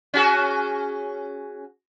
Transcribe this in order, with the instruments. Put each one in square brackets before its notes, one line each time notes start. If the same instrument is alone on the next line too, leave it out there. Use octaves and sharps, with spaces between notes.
[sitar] C#4 F#4 G#4